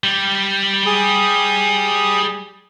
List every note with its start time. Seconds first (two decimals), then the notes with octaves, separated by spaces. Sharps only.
0.04 G3
0.86 G#4 D#6